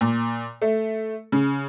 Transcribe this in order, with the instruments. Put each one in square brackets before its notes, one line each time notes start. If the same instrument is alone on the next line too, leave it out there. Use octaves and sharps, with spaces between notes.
[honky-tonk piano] A#2
A3
C#3